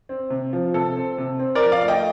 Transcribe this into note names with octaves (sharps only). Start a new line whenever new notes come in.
C4
C3
F3
C3 A4
C4
C3
C4
A#4 D5
F3
D5 F5
A3 D#5 G5